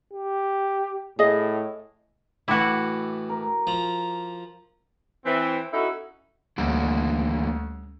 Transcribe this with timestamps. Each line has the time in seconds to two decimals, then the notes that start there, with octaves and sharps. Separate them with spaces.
0.13 G4
1.19 A2 G#4 D#5
2.48 A2 E3 E4 F#4 D6
3.29 A#4
3.67 F3 A#5
5.25 E3 C4
5.73 C#4 D#4 E4 F#4 A4
6.58 D2 D3 E3 G3 A#3 C#4